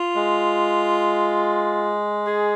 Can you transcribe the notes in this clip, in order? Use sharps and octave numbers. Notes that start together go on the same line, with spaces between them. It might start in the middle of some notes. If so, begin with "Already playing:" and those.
Already playing: F4
G#3
G#4